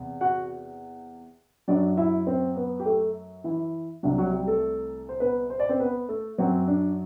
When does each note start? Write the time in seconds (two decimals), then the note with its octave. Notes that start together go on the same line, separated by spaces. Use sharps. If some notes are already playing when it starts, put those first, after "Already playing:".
Already playing: E2 C3
0.21 F#4 F#5
1.68 F#2 F#3 D4 D5
1.97 E4 E5
2.27 C4 C5
2.56 B3 B4
2.80 G4
2.85 A3 A4
3.44 E3 E4
4.03 C2 C3 F#3 D4
4.18 F#3 F#4
4.32 G3 G4
4.47 A3 A4
5.09 C5
5.20 B3 B4
5.50 C5
5.60 D5
5.69 C4 C5
5.80 B3 B4
6.09 A3 A4
6.38 F#2 F#3 C4
6.67 D4